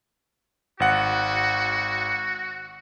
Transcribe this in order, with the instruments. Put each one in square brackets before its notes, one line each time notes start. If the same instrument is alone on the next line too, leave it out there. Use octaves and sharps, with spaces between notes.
[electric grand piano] G#1 F#5 [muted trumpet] F#4